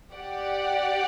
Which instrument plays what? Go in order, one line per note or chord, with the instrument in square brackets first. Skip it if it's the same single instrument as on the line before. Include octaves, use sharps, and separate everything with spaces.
[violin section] G4 D5 F#5